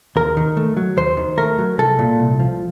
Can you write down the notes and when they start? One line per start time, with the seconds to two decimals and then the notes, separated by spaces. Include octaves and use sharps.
0.16 D#2 A#4
0.37 D#3
0.57 A3
0.77 F#3
0.97 D#2 C5
1.17 D#3
1.38 A3 A#4
1.58 F#3
1.78 C2 A4
1.99 A#2
2.20 C2
2.40 F3